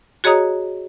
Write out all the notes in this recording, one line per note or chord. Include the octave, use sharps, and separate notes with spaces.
F#4 G#4 C#5 D#5 A#5 D#6